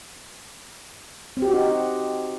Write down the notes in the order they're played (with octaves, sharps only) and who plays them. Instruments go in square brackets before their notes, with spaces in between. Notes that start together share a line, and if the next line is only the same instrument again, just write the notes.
[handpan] C4
G4
F#4
D#4